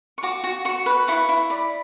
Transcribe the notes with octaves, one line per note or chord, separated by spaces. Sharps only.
C#6
F#4 D6
F#4
F#4 C#6
B4
E4 C#6
E4
D5 B5